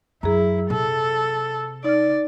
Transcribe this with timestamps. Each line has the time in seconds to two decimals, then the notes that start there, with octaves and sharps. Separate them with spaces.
0.23 F#2 E4 G#4 A#5
0.70 C3 A4
1.84 D#4 D5 F6